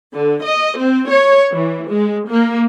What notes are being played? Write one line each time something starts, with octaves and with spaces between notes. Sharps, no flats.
D3
D#5
C4
C#5
E3
G#3
A#3